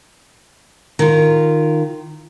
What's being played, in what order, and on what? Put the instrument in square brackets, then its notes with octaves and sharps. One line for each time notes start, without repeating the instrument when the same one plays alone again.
[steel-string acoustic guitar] D#3 F4